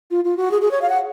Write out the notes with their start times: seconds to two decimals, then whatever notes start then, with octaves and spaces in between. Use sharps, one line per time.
0.11 F4
0.25 F4
0.37 F#4
0.51 G#4
0.62 G#4
0.71 C#5
0.82 F5
0.90 F#5